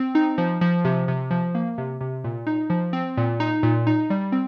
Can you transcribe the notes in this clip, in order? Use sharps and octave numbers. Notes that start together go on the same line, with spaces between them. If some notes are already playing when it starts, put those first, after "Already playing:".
Already playing: C4
D#4
F3
F3
C3
C3
F3
A#3
C3
C3
A#2
D#4
F3
C4
A#2
D#4
A#2
D#4
G3
C4